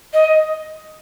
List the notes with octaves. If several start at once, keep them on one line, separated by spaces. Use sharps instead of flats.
D#5